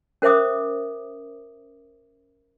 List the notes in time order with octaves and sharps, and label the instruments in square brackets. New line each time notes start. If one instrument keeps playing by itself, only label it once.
[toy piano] C#4 A#4 C5 E5 D6 D#6